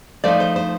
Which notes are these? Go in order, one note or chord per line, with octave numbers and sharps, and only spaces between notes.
F3 A3 D#4 D5
C5
C5